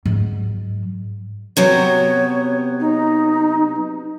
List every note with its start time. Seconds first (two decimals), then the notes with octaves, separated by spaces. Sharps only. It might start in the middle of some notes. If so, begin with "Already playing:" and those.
0.05 G#2 F#3
1.57 C3 F#3 B3 C#5
2.80 D#4